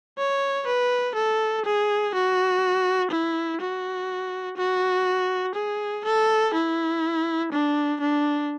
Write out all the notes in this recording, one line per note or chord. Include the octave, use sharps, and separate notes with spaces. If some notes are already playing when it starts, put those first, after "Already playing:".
C#5
B4
A4
G#4
F#4
E4
F#4
F#4
G#4
A4
E4
D4
D4